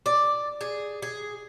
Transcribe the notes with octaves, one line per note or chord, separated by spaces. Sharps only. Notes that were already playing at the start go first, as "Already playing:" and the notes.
D5
G#4
G#4